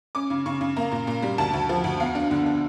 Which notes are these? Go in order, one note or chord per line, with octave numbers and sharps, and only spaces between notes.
C#4 D6
C#3
C#3 C#6
C#3
A#3 A#5
A#2
A#2
G3
D2 A5
D2
F3
D2
E2 F5
D4
D3
D4